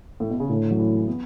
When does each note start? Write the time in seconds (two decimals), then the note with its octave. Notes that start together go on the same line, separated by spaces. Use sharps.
0.20 A2
0.30 B2
0.40 C#3
0.50 A2 D3
0.71 F#3
0.79 E3
1.07 B3